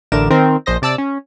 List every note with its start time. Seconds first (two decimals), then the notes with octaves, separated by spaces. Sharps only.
0.12 A1 D3 A3 A#4 D6 E7
0.30 D#3 C4 A#4
0.66 A#1 C5 D#5 A#6
0.82 C3 D5 A5 E6 A6
0.98 C#4